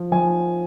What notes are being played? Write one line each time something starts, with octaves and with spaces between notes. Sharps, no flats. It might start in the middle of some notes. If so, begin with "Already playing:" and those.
Already playing: F3
F3 G#5